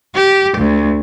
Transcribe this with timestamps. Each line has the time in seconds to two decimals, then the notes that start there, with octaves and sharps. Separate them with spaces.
0.15 G4
0.57 D2